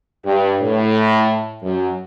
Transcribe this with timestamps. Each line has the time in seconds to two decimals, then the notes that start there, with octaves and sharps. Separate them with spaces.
0.25 G2
0.60 A2
1.63 F#2